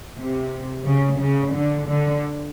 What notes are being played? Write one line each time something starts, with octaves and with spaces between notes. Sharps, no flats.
C3
C#3
C#3
D3
D3